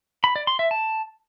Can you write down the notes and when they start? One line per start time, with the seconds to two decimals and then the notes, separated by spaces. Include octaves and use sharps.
0.24 B5
0.36 D5
0.47 C6
0.59 E5
0.71 A5